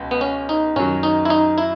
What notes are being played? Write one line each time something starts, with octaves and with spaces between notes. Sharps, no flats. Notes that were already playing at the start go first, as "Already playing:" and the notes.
Already playing: C#2 B2
B3
C#4
D#4
F#2 D#3 F#3 C#4
D#4
E4
D#4
E4